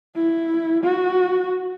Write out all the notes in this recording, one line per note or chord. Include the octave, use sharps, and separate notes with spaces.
E4
F#4